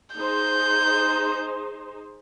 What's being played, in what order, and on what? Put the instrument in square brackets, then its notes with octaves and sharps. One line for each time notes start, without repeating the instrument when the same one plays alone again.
[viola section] D#4 G#4 C5 [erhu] G6